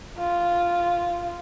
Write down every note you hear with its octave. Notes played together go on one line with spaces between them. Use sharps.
F4